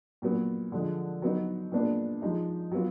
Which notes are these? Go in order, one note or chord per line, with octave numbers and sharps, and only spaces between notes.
A#2 F#3 B3
D3 F3 G#3
F#3 B3 D#4
A#2 G#3 B3 D4
F3 G#3 D#4
F#3 B3 F4